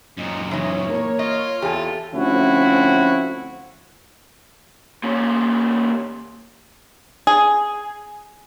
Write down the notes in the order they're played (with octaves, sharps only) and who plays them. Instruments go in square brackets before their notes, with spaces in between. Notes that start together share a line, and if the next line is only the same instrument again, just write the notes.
[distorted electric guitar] F#2 A#2 [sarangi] D#4
[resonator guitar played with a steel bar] E3 D#4 [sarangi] C#5
[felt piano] A#3 A#4
[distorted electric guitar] F4 [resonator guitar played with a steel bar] D#5
[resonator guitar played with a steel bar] E2 G#5 [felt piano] G4 [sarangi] A4
[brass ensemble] D2 F3 C4 C#4 E4 F#4
[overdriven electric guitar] A#2 C#4
[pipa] G#4